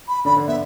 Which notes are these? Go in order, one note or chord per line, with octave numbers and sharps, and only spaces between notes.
B5
D3 D4 B5
D3 D4
B3 E5